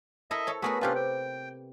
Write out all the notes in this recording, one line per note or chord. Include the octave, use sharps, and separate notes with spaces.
E4 A4 A#4 D#5 E5
A4 C#5
A3 B3 F#4 G#4 A#4 B5
C3 C#4 D4 F4 G4 B4
G5